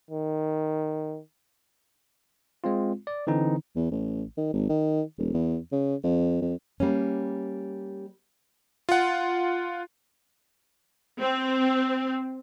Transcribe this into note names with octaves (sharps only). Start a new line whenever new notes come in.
D#3
G#3 C4 F4
D5
D3 E3 C4 D#4
E2
A1
D#3
G#1
D#3
E1
E2
C#3
F2
F2
G3 A#3 C#4
F4 F#5
C4